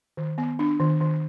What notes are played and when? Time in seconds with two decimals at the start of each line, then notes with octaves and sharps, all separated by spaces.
0.17 D#3
0.38 B3
0.59 D4
0.80 D#3
1.01 D#3